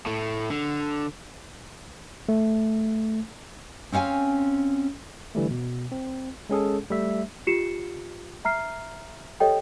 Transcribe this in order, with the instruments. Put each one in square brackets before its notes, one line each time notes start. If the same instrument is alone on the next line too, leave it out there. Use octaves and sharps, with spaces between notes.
[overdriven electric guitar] A2 A3
D3
[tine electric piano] A3
[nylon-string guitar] C4 C#4 F5 F#5 G#5
[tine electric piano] D3 E3 G3 A3
B2
C4
G#3 C#4 G#4 A4
G3 A3 E5
[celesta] F4 G4 C7 C#7 E7
E5 A#5 F6 C7
G4 A4 C#5 D#5 G5